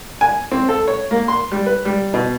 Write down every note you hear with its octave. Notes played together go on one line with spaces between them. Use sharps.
G#5
C4
A4
C#5
A#3
C6
G3
B4
G3
B2